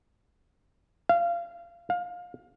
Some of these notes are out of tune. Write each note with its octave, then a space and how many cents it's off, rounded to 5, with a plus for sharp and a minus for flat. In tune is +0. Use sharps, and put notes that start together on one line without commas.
F5 -25
F5 +25